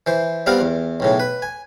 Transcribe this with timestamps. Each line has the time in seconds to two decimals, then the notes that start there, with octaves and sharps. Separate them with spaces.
0.06 E3 C5
0.46 G3 B3 C4 F4 A#4 F5
0.61 E2
1.00 B1 A2 C#3
1.20 B4
1.42 G#5